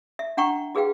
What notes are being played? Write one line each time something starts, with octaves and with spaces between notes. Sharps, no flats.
E5
D4 F#5 G5 A#5 C#6
F#4 G#4 B4 F5 G5